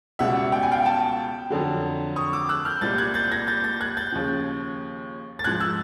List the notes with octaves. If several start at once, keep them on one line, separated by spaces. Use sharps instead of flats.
C#2 B2 G3 E5 F#5
G5
G#5
F5 G5
G5 A5
F2 D3 F#3
C#6 D#6
D6 E6
E6 F#6
F6 G6
C2 A#2 G3 G6 A6
F#6 G#6
G6 A6
G#6 A#6
G6 A6
G6 A6
F#6 G#6
G6 A6
D#2 C#3 F3
A6
G#2 F3 F#6 G#6
E6 F#6